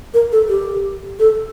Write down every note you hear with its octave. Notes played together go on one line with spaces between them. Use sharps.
A#4
A4
G4
A4